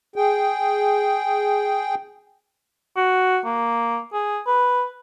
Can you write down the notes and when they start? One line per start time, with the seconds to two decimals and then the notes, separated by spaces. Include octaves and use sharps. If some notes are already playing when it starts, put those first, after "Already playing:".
0.16 G#4 G5
2.97 F#4
3.45 A#3
4.13 G#4
4.47 B4